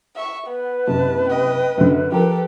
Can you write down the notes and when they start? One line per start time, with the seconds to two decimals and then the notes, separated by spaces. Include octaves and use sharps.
0.16 E5 C#6
0.47 B3 B4
0.87 F#1 C3 A5
1.29 D#5 G5
1.77 F#2 D3
2.12 F3 G4 A4 A#4